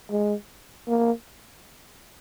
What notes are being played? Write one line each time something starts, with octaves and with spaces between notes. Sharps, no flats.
G#3
A#3